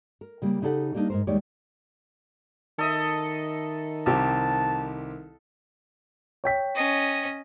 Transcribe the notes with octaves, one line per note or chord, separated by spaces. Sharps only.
A#4
C#3 G3 A#3
C#3 D#4 G4 A4 D#5 F#5
G3 A#3 D4 D#4 A#4
G#2 A#4 C5
D#2 G3 G#3 D#4 C#5 D5
D#3 A4 D#5 E5
C2 C4 G4 A5
C#5 G5 B6
C#4 D#5